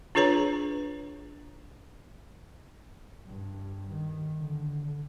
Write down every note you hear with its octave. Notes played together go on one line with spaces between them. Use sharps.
D4 F4 G#4 B4 C#5 A#5
G2
D#3
D3